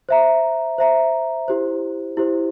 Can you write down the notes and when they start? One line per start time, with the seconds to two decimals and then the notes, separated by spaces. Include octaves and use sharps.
0.09 C5 E5 A#5
0.78 C5 E5 A#5
1.48 E4 G4 C5
2.17 E4 G4 C5